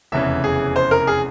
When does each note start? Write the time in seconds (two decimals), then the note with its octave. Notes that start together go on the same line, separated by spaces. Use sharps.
0.12 F1 E2 C#3 E3 E5
0.44 G#4
0.76 C5
0.91 A#4
1.07 G#4